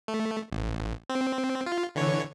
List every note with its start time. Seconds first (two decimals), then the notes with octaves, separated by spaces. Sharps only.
0.08 A3
0.52 A1
1.10 C4
1.66 F4
1.96 D3 E3 C#5